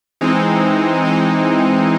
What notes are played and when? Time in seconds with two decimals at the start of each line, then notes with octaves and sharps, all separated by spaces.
0.21 E3 G#3 C4 D#4
1.05 E3 G#3 C4 D#4